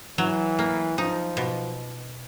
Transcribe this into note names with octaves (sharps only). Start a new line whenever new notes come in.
E3 F#3
A#3
F3 D#4
B2